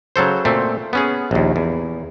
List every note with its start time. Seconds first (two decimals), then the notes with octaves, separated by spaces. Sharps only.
0.16 C#3 F#3 A4 C5
0.45 A#2 A3 C4
0.93 B3 C#4 G#4
1.31 A#1 D#2
1.56 E2